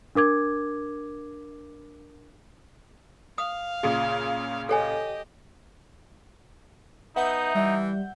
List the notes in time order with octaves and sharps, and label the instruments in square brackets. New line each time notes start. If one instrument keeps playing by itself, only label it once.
[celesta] D4 A#4 D6 G#6
[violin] F5 [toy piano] D#6
[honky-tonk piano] A#2 C#3 [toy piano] G#4
[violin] G4 D#5 [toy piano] A4 C#5 G#5
[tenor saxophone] B3 [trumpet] D#4 [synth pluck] E5 F#5 G6
[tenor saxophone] E3 [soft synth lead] G3